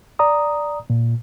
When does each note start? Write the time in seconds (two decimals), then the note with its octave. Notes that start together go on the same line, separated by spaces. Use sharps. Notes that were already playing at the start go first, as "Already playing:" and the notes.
0.19 D5 A#5 D#6
0.90 A#2